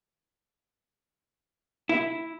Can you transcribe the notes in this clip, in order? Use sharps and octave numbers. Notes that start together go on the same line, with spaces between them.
E4